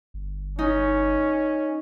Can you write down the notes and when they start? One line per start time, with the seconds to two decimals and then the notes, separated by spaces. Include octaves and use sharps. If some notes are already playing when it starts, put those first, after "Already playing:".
0.14 G1
0.59 C#4 D#4